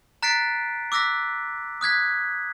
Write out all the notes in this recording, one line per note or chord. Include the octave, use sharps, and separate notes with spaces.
A#5 F#6 A6 B6 C7 D7
D6 E6 F#6 A#6 B6
D#6 F#6 G#6 B6